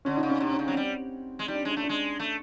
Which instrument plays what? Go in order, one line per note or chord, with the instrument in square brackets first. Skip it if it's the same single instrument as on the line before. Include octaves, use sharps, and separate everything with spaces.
[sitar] D3 [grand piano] C#4
[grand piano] D#4
[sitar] C#3
[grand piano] C#4
[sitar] C3 [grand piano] D4
[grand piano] C#4
[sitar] C#3
[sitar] F#3 [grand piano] C4
[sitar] G3
G#3
[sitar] G3 [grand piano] D#4
[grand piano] D4
C#4
[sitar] G#3 [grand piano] D4
[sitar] A3
[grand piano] D4
[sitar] G#3
A3